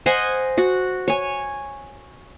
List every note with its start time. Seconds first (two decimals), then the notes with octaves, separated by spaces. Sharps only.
0.06 C5 D#5 F#5 G#5
0.58 F#4 F#5
1.08 C#5 G#5